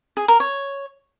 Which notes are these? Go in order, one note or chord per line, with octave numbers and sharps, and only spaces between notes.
G#4
A#4
C#5